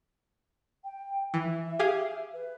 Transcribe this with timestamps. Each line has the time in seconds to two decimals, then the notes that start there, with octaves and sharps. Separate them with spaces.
0.84 G5
1.34 E3 E5
1.79 G4 G#4 F5
2.34 B4